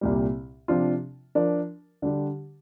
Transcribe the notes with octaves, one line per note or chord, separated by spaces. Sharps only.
C2 A#2 G3
C3 F3 D4 F4
F3 D4 A#4 D5
D3 G3 D4 G4